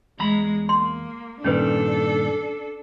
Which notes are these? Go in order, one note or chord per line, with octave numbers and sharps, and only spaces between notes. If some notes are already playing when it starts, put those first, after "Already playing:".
E2 G#3 A#5 B5
A#3 C6
G2 A#2 D#3 C#4 D4 A4 B4